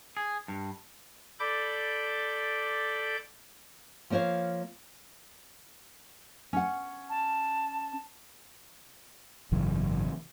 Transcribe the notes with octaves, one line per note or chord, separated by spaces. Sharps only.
G#4
G2
A4 D5 B5 D6 G6
F3 A#3 C5 C#5 F5
C#4 F#5
A5
G#1 F#2 C#3 E3